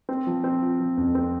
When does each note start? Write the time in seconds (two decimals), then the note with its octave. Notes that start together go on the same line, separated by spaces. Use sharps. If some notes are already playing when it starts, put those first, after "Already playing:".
0.09 C4
0.27 F3
0.44 C4
0.62 F4
0.80 F3
0.97 F2
1.15 C4